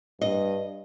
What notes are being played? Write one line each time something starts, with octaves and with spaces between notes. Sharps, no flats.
G2 D#5